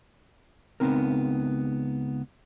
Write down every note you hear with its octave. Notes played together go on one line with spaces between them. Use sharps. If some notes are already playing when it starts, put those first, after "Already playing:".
C#2 D3 B3 C4 D#4 A#4